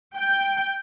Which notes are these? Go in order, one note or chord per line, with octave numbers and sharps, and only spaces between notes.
G5